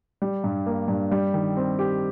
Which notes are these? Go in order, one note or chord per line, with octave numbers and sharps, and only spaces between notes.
G3
G2
A#3
G2
G3
D#3
C4
G4